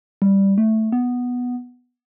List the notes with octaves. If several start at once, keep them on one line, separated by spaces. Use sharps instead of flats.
G3
A3
B3